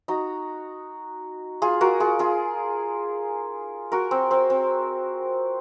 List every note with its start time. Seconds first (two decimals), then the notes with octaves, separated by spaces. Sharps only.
0.08 D#4 F#4
1.62 F4 G#4
1.81 F#4 A#4
2.00 F4 G#4
2.19 F4 G#4
3.92 F#4 A#4
4.11 C4
4.31 C4
4.50 C4